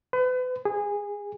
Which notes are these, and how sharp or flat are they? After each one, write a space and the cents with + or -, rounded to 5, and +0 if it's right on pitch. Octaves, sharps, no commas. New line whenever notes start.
B4 +35
G#4 -20